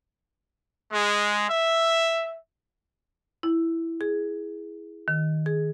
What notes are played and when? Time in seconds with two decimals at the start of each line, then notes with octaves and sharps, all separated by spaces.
0.93 G#3
1.50 E5
3.43 E4
4.01 G#4
5.08 D#3
5.46 G#4